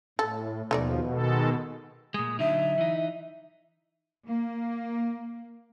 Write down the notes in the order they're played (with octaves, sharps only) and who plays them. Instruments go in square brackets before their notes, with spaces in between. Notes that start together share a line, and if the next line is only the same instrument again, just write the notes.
[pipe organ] A2 [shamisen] A4
[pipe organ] D#2 F3 [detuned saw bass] B2 [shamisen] A3 D#4 D5
[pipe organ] D#3 G#3 A4
[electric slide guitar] A#2 G#3 [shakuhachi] D#6
[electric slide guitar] D3 F#3 D#4 [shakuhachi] E5
[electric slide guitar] E3 D#4
[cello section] A#3